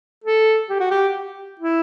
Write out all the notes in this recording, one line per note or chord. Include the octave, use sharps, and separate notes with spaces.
A4
G4
F#4
G4
E4